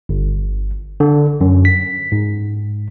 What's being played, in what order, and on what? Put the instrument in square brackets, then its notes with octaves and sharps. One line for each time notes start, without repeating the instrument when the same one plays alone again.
[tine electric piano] G1
D3
F#2
B6
G#2